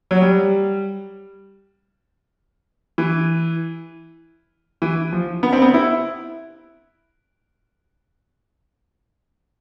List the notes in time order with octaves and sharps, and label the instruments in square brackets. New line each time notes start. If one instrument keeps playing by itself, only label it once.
[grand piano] F#3
G3
E3
E3
F3
B3
C4
B3
E4